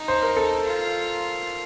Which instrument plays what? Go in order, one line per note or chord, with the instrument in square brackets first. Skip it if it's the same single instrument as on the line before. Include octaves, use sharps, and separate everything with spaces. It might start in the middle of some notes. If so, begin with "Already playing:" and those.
Already playing: [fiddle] D#4
[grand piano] C5
A#4
A4
[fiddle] F4